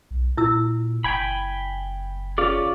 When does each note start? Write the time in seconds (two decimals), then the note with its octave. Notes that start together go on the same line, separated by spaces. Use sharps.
0.11 B1
0.37 A#2 E4 E6
1.04 F#1 G5 G#5 B5
2.38 C#4 F4 G#4 D5